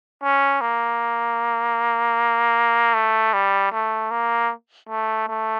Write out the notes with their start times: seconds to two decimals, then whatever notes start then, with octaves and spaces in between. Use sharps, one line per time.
0.23 C#4
0.61 A#3
2.94 A3
3.33 G3
3.72 A3
4.11 A#3
4.89 A3
5.28 A3